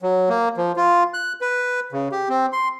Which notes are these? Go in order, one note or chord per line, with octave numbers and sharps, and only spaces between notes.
F#3
A#3
F3
F4
F#6
B4
C#3
G4
C4
C6